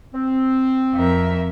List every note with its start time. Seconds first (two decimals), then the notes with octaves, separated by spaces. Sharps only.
0.14 C4
0.95 F2 A#4 E5